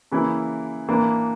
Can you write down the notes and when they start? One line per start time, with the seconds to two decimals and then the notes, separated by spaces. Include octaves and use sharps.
0.12 C#3 E3 A#3 E4
0.88 E3 A#3 D4